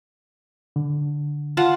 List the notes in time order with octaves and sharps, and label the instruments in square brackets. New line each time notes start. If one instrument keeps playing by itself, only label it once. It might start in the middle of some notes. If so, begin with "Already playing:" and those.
[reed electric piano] D3
[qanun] F4 F#5 A5